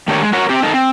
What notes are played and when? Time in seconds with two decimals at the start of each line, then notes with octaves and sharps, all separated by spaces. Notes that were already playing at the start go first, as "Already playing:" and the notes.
0.08 D#3 A3 D4 G4 A#4 C#5
0.21 G#3
0.33 F#4 A#4 C#5
0.49 C4 G4
0.62 D#4 A4 A#4
0.74 C4